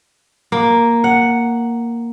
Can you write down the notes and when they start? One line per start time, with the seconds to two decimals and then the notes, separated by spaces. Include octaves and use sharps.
0.52 A#3
1.04 F#5